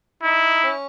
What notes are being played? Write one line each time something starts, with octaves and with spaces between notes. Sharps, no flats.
D#4 E4
C#4